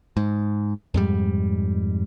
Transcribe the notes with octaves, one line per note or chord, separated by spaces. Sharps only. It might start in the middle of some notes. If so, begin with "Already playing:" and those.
G#2
F2 G#2 G3